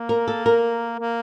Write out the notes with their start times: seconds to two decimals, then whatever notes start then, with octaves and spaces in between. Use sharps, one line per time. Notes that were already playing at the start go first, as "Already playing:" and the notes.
Already playing: A#3
0.09 A#4
0.28 A4
0.46 A#4
0.99 A#3